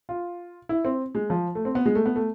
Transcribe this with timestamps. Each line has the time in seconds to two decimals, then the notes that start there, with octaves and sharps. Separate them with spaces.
0.09 F4
0.69 E4
0.85 C4
1.15 G#3
1.30 F3
1.55 A3
1.65 C4
1.75 B3
1.86 G#3
1.95 A3
2.06 B3
2.16 A3